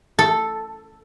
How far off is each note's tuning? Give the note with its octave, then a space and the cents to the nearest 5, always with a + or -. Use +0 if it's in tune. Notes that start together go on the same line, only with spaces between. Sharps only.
A4 +0